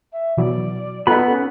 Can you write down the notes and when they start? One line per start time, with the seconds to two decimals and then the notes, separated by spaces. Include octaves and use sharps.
0.12 E5
0.37 B2 E3 F#3 D5
1.07 B3 D#4 F4 A4 B5
1.30 C#4